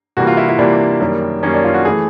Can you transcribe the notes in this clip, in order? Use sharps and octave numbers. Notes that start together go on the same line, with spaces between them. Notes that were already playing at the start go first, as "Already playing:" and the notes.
C3 E3 G3 A#3 F#4
F4
E4
E4
C3 E3 G3 A#3 D4
F#2 D#3 G3 A#3
F#2 D#3 G3 A#3 C#4
D4
F4
F#4
E3 A3 G#4